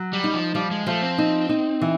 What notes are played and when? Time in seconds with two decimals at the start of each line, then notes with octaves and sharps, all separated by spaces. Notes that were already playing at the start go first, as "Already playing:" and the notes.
Already playing: F#3
0.13 G3
0.24 D#4
0.34 F3
0.55 F3 G3
0.71 G#3
0.86 F3 A3
1.02 C4
1.18 D#4
1.49 D#4
1.82 E3